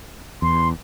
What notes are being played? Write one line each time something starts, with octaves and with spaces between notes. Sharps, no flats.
E2 C6